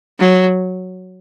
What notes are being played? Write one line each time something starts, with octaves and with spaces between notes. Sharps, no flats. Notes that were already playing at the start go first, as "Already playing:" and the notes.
F#3